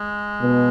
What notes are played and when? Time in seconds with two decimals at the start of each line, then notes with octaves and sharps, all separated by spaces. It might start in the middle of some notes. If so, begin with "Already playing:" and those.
Already playing: G#3
0.41 B2